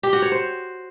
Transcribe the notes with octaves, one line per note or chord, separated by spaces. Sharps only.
G4
F#4
C#5
C5